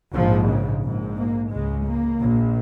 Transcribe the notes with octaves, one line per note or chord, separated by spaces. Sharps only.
A#1 G#2 F3
C#3
A#1 G#2
A#3
C#2 C#3 G#3
A#3
A#1 A#2